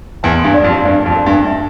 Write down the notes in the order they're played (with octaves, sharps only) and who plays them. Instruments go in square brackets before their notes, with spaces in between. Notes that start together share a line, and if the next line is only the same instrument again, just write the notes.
[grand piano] E2 [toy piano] A5
[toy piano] C6
[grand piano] G2
[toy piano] D5
[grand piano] F2
[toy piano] G4
[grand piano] G2 [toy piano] D5
[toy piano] A5
[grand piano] F2
[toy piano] A4
[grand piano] G2
[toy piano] D4
E5